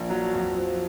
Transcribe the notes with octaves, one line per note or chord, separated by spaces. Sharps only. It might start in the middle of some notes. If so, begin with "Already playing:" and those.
Already playing: A#1
F#3
F2
F3